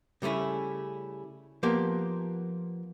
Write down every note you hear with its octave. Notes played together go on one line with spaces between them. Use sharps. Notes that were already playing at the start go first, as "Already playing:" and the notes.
C#3 G3 A3 C#4 E4
F3 A#3 B3 G4 A#4